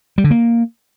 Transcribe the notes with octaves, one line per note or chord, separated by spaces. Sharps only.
G3
D3
A#3